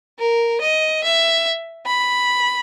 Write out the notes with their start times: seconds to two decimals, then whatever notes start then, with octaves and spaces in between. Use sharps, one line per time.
0.19 A#4
0.61 D#5
1.04 E5
1.87 B5